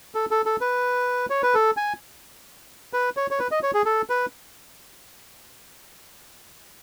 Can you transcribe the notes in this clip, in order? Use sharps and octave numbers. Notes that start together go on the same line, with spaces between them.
A4
A4
A4
B4
C#5
B4
A4
G#5
B4
C#5
C#5
B4
D#5
C#5
G#4
A4
B4